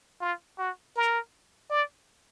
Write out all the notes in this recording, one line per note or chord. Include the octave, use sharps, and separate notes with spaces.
F4
F#4
A#4
D5